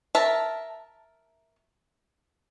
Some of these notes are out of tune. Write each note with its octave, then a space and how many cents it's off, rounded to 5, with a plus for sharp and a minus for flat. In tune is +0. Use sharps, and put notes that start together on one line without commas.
A#4 +0 E5 -5 A5 +0